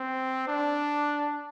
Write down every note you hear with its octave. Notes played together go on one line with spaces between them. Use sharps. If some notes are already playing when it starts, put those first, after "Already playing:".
Already playing: C4
D4